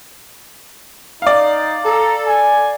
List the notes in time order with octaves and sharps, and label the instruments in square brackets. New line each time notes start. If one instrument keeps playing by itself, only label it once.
[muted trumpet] D#4 [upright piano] D5 F5
[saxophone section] A4 [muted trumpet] A#5
[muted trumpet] G#5